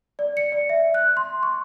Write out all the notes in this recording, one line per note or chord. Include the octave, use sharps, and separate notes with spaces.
D5
C#7
D5
E5
F#6
C6
C#6